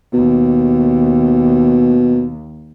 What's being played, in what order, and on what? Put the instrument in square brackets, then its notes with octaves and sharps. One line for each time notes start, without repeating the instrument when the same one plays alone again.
[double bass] D#2 [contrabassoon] B2